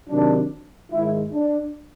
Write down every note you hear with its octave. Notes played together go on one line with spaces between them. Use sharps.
C3 D#3 F#3 D4
G#2 D#3 G#3 E4
D4